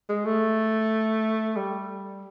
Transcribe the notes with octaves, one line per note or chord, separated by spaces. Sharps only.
G#3
A3
G3